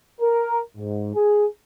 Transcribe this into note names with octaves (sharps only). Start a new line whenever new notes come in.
A#4
G#2
G#4